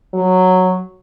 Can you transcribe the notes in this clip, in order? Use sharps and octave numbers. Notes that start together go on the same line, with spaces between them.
F#3